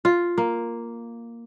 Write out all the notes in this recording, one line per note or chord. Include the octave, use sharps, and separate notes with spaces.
F4
A#3